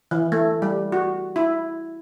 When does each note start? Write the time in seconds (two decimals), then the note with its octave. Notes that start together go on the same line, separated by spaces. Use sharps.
0.11 E3
0.32 A3
0.62 G3
0.92 F#4
1.36 E4